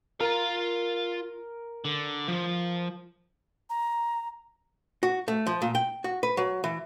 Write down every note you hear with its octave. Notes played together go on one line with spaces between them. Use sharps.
F4 A#4 F5
D3
F3
A#5
F#4
A3
F3
A#2
G5
F#4
B4
F#3
E3